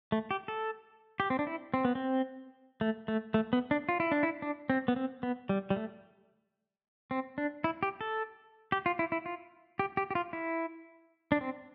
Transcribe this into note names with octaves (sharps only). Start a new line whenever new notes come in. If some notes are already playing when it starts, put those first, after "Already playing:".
A3
G4
A4
G4
C4
D4
E4
C4
B3
C4
A3
A3
A3
B3
D4
F4
E4
D4
E4
D4
C4
B3
C4
B3
G3
G3
A3
C4
D4
E4
G4
A4
G4
F4
E4
E4
F4
G4
G4
G4
F4
E4
D4
C4